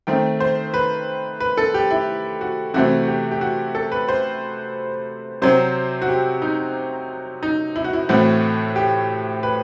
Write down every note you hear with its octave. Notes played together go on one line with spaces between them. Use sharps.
D#3 A3 C4 G5
C5
B4
B4
A4
G4
E4
F#4
C3 E3 A3 C4 F#4
G4
G4
F#4
A4
B4
C5
C3 F#3 C4 C5
F#4
G4
D#4
D#4
E4
F#4
E4
A2 E3 A3 C4 F#4
G4
B4